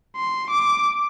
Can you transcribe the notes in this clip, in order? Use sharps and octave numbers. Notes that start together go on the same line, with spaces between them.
C6
D6